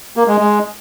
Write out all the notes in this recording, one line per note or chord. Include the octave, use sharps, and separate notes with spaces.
A#3
G#3
G#3